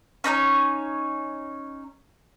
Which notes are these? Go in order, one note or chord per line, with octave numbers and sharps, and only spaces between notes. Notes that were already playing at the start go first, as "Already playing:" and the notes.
C#4 D#4 B4 C#5